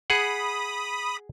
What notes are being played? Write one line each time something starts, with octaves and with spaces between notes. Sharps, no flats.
G#4 F#5 B5 D#6